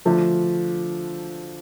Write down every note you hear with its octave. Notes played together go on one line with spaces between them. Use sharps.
D3 F3 A3 D4 F4